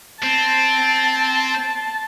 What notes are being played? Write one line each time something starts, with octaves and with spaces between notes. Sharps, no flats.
C4 A5